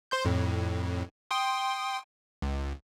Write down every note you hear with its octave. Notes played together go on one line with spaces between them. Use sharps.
C5 C6 G6
F2 A2
G5 C6 D#6
C#2